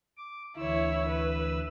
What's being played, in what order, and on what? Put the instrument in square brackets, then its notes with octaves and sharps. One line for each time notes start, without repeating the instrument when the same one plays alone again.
[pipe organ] D6
[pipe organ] D2 E3 E6 [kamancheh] E4 C#5
[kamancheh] B4